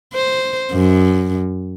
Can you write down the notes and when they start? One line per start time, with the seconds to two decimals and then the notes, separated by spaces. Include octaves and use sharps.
0.14 C5
0.72 F#2